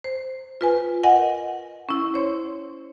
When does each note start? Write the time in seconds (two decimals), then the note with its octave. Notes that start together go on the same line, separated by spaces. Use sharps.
0.04 C5
0.61 F4 B4 G#5
1.03 A#4 D#5 F#5 G#5
1.89 C#4 E4
2.14 C5 C#5 C6